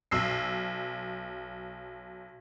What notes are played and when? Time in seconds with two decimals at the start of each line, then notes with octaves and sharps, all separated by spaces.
0.11 B1 E6 C7